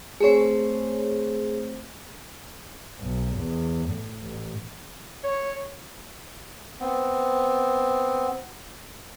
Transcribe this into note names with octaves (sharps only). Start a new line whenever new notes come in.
A3 C4 G#4 C5 C#5
B1
E2
A2
A1
C#5
B3 C4